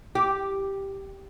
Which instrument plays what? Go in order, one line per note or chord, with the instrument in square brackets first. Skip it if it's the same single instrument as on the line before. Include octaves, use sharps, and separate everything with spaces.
[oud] G4